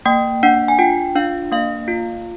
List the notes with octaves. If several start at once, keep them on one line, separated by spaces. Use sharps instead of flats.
A#3 G5
D4 F#5
G#5
F4 G5
D4 F5
A#3 F5
F4